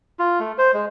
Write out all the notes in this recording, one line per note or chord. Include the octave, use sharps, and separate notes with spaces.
F4
A3
C5
G#3